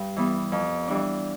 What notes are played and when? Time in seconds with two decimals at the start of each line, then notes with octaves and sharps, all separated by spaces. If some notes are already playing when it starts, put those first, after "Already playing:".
Already playing: G2
0.17 E3 G3 B3
0.52 F2
0.88 E3 G3 D4